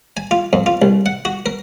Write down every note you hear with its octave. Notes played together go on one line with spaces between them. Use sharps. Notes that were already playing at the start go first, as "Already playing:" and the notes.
G#5
F4
F2
F4
C2
F#5
F#4
A#4